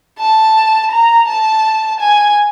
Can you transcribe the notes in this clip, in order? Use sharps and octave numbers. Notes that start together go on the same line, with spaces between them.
A5
A#5
A5
G#5